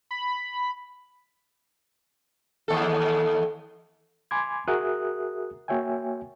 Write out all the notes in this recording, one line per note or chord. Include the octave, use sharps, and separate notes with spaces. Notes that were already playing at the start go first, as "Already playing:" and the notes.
B5
D#2 A4
G#5 B5 C6 D6 G#6
F#4 G#4 A#4 E5 D#6 F#6
A#3 F#4 C#5 E5 G5 G#5